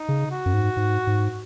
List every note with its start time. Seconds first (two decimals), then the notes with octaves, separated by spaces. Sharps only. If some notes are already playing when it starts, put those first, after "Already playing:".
Already playing: D#4
0.09 C#3
0.31 F#4
0.46 F#2
0.54 G#2
0.77 G#2
1.07 G#2